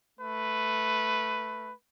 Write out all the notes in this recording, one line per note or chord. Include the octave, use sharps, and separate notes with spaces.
A3 B4